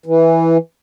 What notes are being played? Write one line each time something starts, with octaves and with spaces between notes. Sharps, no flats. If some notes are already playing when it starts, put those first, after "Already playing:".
E3